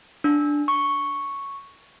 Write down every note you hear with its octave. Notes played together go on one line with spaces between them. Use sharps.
D4
C#6